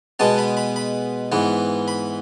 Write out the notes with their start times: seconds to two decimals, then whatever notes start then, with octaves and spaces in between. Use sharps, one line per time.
0.19 B2 G#3 B3 A5
0.38 B5
0.57 B5
0.76 B5
1.32 G#2 E3 B3
1.88 B5